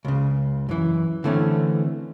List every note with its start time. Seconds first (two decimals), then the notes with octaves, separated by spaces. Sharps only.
0.05 C#2 C#3
0.69 F#2 E3
1.24 D3 E3 A3 C4 C#4